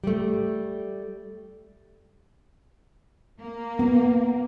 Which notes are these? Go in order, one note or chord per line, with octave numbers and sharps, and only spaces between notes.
G3 A3
A#3
B3